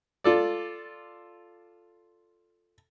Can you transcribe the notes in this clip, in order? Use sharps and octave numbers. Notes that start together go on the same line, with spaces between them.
F4 A4 D5